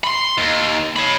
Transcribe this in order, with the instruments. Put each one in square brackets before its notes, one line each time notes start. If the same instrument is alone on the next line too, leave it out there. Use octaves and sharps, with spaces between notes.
[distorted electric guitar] B5 C6
D#2
C#5 B5